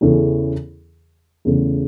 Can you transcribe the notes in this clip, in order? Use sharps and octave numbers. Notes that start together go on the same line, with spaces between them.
E2 C#3 E3 C#4 A4
E2 C#3 A3